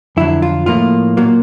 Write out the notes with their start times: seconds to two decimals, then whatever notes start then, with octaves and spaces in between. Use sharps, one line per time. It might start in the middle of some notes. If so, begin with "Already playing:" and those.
0.17 F2 D3 F#3 E4
0.42 F4
0.66 A2 F3 A#3 F4
1.17 A#2 F#3 A#3